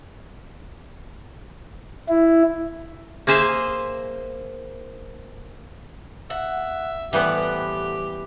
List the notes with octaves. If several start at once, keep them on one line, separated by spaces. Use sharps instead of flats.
E4
A#3 G#4 C5 E5 F5
E5 F#5
A2 E3 G3 B3 G4 C5 F#5